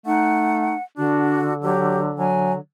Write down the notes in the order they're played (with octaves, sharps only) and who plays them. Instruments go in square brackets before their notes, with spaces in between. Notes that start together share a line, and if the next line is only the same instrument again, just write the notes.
[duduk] A3 [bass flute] D#4 [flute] F#5
[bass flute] D3 [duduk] D4 [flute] F#4
[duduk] F#3 [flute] G4
[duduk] F#3 [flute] G#5